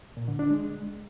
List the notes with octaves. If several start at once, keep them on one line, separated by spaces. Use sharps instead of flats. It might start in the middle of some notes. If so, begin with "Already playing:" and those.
A#2
D3
D4
G#3